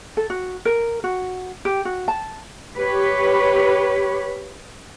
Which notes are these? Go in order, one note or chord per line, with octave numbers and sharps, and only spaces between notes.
A4
F#4
A#4
F#4
G4
F#4
A5
G4 B4 C#5